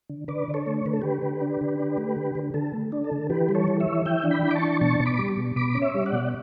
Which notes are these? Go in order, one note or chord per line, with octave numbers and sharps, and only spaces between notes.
D3
D3 B4 D5
D3
A4 C#5
A3
C#5
D3 B4
A4
D3 G4 B4
D3
D4
D3
D4
A3
D3
D3
D3 A4
A3
D4
A4
D3
E3 G4 B4
G3
A4 C#5
E3
C#5 E5
E3
E3 E5 G5
D4
G5 B5
E3
D6
A5 C#6
D4
B2 A5 C#6
B2
B5 D6
G3
B2
B2 B5 D6
C#4
C#5 E5
G3
D5 F#5
B2